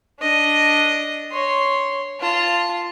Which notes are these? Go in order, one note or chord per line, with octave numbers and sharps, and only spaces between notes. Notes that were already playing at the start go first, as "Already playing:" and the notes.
D4 D#5
C#5 C6
F4 A5